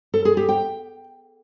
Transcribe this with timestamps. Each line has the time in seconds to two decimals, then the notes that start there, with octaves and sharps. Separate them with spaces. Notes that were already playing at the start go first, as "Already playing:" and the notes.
0.14 A4
0.25 G#4
0.37 G4
0.49 G5